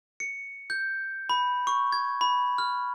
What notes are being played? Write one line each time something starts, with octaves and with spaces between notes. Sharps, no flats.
C#7
G6
B5
C#6
G#6
B5
F6